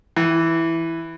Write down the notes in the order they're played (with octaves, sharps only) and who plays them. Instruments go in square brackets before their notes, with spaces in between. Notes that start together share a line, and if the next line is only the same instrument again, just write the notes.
[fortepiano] E3